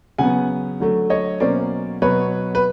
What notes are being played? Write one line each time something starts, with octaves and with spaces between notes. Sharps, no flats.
C#3 F#3 B3 F#5 G#5
D3 F#3 A3
C#5 D#5
B2 F#3 A#3 C#4 C5 D5
B2 F#3 B3 B4 C#5
B4